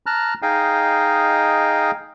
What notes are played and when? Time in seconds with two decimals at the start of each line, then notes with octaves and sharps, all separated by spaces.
0.06 A5 A#5 F6 F#6
0.42 D#4 G#4 D#5 F5 G5